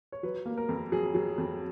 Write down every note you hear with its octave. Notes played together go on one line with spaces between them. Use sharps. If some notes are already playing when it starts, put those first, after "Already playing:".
C#5
F#3 B4
A#3
A#4
F2
F#3 G#4
F#3
F2